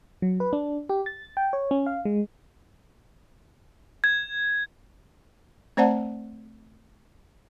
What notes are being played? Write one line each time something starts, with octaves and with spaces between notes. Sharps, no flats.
F#3
B4
D4
G4
A6
G5
C#5
C#4
F5
G#3
G#6
A3 C4 C5 D5 F#5 A5